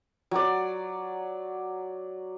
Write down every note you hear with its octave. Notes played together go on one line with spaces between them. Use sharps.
F#3 D5